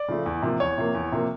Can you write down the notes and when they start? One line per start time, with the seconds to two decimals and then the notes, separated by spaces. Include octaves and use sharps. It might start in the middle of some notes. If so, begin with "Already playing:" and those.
Already playing: D5
0.08 C#3 F3 A3
0.26 E2
0.42 C3 F3 A#3
0.60 E2 C#5
0.78 C3 F3 A#3
0.95 E2
1.12 C3 F3 A#3